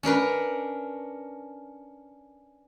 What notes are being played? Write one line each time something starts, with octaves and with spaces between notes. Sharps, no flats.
C#4 D4 A#4 B4